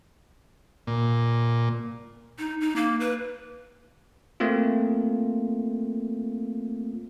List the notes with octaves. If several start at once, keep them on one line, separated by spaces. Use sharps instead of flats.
A#2
D#4
D#4
A#3
B4
A3 A#3 C4 F4